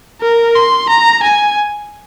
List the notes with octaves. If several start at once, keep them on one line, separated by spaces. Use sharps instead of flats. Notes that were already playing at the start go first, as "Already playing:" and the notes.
A#4
C6
A#5
G#5